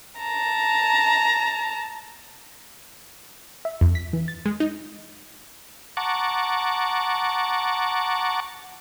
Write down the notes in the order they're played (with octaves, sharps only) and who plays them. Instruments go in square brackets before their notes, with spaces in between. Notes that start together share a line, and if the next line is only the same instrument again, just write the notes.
[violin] A5 A#5
[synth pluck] E5
F2
B6
E3
A6
G#3
D#4
[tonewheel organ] F#5 A5 A#5 C#6 D6